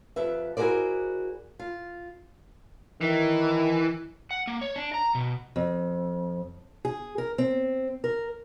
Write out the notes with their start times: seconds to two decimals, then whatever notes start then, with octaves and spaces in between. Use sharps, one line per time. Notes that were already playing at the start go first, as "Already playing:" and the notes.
0.16 F2 G4 B4 E5
0.57 E4 F#4 G#4 A#4 C5 D5
1.59 F4
3.01 D#3 E3
4.31 F#5
4.47 A#3
4.61 C#5
4.76 D4
4.94 A#5
5.15 B2
5.56 F2
6.85 G#4
7.18 A#4
7.38 C4
8.04 A#4